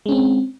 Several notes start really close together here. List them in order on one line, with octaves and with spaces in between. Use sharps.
G#3 C#4 C4